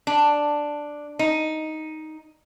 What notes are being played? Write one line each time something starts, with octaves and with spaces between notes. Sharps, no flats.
D4
D#4